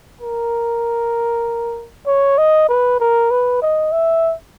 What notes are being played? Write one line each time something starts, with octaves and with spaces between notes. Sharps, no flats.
A#4
C#5
D#5
B4
A#4
B4
D#5
E5